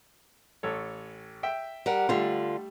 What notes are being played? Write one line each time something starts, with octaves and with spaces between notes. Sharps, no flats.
A1 A4 C#5
E5 G5
G3 A#4 F#5
D3 G3 A3 F4